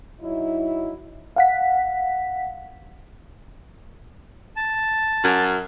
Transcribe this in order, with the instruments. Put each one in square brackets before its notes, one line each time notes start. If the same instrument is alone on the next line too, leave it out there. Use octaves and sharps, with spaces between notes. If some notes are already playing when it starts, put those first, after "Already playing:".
[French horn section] F#3 D#4 E4
[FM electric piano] F5 F#5 B6
[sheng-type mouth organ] A5
[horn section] F#2